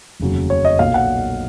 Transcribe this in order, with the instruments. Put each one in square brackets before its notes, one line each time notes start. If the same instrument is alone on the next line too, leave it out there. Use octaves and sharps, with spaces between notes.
[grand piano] F1 D#2 C#3 F#3
C#5
D#5
B1 A#2 F#3 F5
F#5